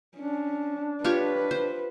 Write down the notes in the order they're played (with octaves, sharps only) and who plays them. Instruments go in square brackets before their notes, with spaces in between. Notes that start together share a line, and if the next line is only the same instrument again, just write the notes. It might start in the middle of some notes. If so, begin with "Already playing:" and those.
[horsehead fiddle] C#4 [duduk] D4
[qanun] F4 G4 C#5 [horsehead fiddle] B4
[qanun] C5